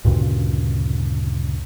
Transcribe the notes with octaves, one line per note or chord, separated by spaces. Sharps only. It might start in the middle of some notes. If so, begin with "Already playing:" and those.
D2 G2 A#2 C#3